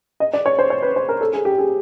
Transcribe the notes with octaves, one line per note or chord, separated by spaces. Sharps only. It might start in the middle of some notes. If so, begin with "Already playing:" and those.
D#5
D5
C#5
C5
C#5
B4
C5
A#4
A4
G#4
G4
G#4